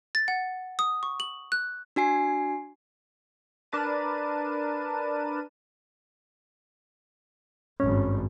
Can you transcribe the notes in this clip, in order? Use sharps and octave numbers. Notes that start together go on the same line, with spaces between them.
A6
F#5
D#6
C#6
F#7
F#6
D4 F#4 G#5 C7
D4 A#4 B4 A5 D#7
G#1 G2 C#4